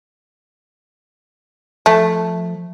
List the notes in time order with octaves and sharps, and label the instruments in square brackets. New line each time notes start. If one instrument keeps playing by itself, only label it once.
[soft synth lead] F3 [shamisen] A3